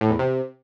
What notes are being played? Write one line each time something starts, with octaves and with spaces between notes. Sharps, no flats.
A2
E2
C3